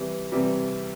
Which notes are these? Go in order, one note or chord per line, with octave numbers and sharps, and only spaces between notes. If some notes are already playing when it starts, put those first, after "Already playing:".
Already playing: C3 E3 G3
C3 E3 G3